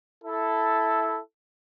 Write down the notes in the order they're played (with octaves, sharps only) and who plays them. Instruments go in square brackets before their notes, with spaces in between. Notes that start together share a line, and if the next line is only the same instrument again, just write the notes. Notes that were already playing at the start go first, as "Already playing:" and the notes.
[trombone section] E4 A4